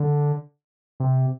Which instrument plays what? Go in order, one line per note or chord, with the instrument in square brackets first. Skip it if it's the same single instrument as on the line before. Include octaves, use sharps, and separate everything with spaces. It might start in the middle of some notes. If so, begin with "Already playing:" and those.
Already playing: [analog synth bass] D3
C3